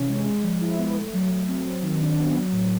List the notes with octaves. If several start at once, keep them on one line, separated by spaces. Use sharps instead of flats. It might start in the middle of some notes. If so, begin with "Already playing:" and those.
Already playing: C3 E3 C#4
G#3
G#3
F3
E4
B3
A3
F#3
F#3
C4
F#3
D#3
D4
B3
F#3
A2